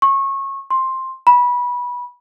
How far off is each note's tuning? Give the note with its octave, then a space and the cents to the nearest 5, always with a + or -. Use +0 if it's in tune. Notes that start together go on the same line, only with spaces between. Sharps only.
C#6 -25
C6 +10
B5 -20